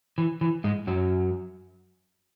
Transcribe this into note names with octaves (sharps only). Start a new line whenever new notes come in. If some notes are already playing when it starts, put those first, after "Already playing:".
E3
E3
G#2 G#3
F#2 F#3